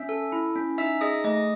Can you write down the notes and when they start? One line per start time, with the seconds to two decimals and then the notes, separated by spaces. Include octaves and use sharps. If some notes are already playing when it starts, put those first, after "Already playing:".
Already playing: C#4 E5 E6
0.09 A4
0.32 E4
0.56 C#4
0.78 D#4 E5 E6
1.01 G#4 D#5 D#6
1.24 A3 D#5 D#6